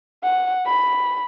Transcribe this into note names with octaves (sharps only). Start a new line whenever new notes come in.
F#5
B5